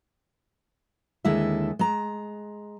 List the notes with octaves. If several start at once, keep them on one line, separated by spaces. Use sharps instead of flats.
D#2 D3 G#3 E4 A4 E5
G#3 A#5